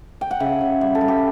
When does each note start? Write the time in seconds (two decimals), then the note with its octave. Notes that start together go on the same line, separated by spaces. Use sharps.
0.21 G5
0.31 F#5
0.40 C#3 E5
0.61 C#3
0.81 G3 E5
0.95 A4
1.01 G3
1.08 G4